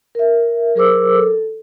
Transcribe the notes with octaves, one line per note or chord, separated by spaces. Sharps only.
A#4 E5
F#3 G#4 A#4 C5 D6 E6
A4